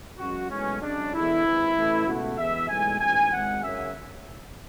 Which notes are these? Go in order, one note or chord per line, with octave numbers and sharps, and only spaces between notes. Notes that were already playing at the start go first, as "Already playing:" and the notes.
F#2 C#3 G#3 F#4
B1 A2 E3 G#3 C#4
F#2 C#3 G#3 D4
E2 D3 G#3 E4
G#1 G#2 E3
A1 A2 E3 A3
C#2 B2 A3 F#4
E2 B2 G#3 E5
B1 A2 E3 G#3 G#5
A1 G#2 E3 G#5
G#1 G#2 G#3 F#5
F#2 C#3 E5